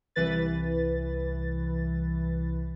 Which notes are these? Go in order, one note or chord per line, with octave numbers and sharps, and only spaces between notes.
C2 E3 B4 A6